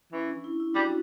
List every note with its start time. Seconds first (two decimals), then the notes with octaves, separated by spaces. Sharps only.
0.13 E3 C#4
0.29 D4
0.44 E4
0.60 E4
0.74 G3 D4 F#4